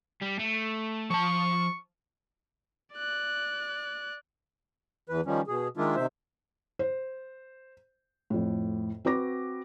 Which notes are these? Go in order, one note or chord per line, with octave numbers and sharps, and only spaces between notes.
G3
A3
F3 A5 C#6
D5 F#6
E2 E3 B4
D#3 F3 G3 C#4
B2 G#4
D#3 G#3 A#3 D4 E4 F4
C3 D#3 C5 E5
C5
F2 A2
C4 F#4 B4 D6 A#6